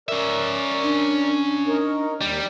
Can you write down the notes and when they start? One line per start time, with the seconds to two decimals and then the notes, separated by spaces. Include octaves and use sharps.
0.09 C#4 A#4 D5 E5
0.83 D4
1.68 D#4 A#4 C#5
2.21 D#2 G3